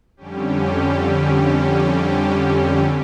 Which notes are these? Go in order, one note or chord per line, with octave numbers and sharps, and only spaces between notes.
F2 D3 G3 C#4 G4